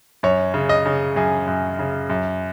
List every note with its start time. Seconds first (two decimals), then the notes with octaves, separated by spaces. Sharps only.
0.23 F#2 C#5
0.54 C#3
0.69 D#5
0.86 C#3
1.16 F#2 G#4
1.47 F#2
1.79 C#3
2.10 F#2